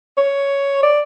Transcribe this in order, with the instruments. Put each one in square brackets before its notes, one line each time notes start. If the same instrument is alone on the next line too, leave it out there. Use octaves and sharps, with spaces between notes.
[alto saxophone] C#5
D5